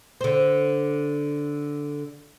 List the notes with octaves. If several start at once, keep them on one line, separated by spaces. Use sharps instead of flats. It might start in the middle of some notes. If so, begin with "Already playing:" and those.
D3 C5